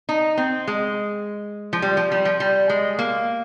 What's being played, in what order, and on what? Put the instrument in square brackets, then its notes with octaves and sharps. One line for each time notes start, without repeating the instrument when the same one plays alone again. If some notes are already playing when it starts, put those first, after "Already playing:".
[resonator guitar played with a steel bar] D#4
C4
G#3
F3
G3
F3
G3
F3
G3
G#3
A#3